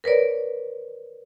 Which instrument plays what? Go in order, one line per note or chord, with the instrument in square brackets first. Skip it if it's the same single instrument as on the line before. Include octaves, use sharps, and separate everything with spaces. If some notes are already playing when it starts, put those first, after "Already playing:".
[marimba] A#4 B4 C#5 D5